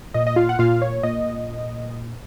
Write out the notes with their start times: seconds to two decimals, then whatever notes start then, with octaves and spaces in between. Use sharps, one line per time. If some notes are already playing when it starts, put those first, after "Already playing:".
0.14 A#2 D#5
0.27 D#5
0.36 F4 F5
0.49 F#5
0.59 A#2 F4 F5
0.82 C#5
1.03 A#2 D#5